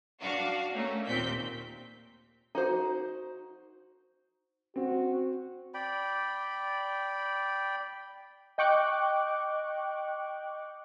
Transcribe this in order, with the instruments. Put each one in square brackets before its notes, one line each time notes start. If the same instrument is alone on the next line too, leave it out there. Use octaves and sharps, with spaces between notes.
[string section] D4 F#4 F5
A3 A#3 C#4
D#2 A#2 C4 G6 B6
[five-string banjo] D#4 F#4 C5
[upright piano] C4 [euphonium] F#4
[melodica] D5 G5 B5
[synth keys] D#5 G5 C#6 D6 F#6